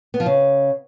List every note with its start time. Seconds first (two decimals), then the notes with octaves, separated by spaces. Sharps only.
0.14 B3
0.20 F3
0.26 C#3